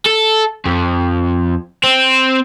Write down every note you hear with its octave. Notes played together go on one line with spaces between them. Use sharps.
A4
F2
C4